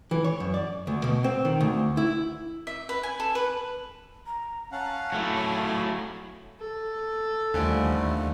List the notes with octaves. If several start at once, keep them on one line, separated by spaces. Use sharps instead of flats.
E3
C#5
F#2
D5
D2
B2
C4
D#3
D2
E4
E5
B4
G#5
A4
B4
A#5
C#4 F5 F#5 A5
F#3 A3 E4
C#5 F5 G#5
A4
D#2 D3 F3 G3 A3 G#5 D7